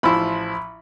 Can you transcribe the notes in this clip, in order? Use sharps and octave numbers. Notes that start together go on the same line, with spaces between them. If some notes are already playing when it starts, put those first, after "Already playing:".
A1 F3 E4 B5 C6